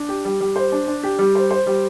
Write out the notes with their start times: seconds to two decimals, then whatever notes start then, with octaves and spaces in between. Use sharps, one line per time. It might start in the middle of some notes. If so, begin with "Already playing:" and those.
Already playing: D4
0.09 G4
0.25 G3
0.40 G3
0.56 C5
0.72 D4
0.87 D4
1.03 G4
1.19 G3
1.35 C5
1.51 C5
1.67 G3